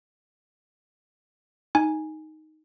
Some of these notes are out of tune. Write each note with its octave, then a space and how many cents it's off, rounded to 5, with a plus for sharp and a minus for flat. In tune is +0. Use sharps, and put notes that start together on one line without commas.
D#4 +5 G#5 +0